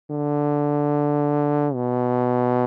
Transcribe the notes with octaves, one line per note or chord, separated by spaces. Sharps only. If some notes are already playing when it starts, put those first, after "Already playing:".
D3
B2